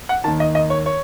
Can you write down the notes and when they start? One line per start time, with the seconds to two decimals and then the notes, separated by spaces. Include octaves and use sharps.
0.09 F#5
0.24 D#2 D#3 A5
0.40 D#5
0.55 D#5
0.70 C#5
0.86 C#5